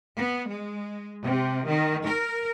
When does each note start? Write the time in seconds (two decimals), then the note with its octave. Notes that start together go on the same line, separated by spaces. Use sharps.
0.18 B3
0.49 G#3
1.23 C3
1.67 D#3
2.05 A#4